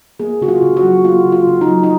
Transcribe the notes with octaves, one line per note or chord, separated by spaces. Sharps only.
A#3 G#4
C#3 F#4
F4
C#3
F#4
F#3
A#3 F4
C#3
F4
C#3
D#4
F#3
D#4